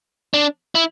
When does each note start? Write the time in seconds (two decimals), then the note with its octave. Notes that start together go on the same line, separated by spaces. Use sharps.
0.34 D4
0.75 E4